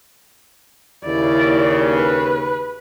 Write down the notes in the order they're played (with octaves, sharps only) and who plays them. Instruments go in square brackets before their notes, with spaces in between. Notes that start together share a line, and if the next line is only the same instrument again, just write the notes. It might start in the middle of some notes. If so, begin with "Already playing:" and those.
[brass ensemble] D#2 C#3 [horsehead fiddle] E4 D5
[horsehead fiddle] B4